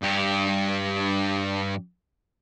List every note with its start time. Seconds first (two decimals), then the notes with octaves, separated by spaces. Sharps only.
0.02 G2 G4